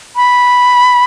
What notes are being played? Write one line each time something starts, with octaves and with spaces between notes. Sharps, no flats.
B5